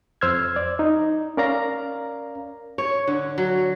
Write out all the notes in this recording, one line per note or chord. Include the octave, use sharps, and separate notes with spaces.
F2 C5 E6 F6 G#6
D5
D#4
C#4 A#4 D5 F5 A#5
C#5
D3
F#3